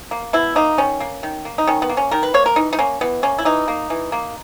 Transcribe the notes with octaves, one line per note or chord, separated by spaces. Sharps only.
A#3
B2 E4
A#3 D#4
D#3 C#4
A#3
D#3
A#3
D#4
D#3 C#4
B3
A#3
C#4
D#3 A#4
B4
A#3 C#5
A#4
E3 D#4
D#4
A#3 C#4
E3 B3
A#3 C#4
E4
E3 D#4
A#3
E3
A#3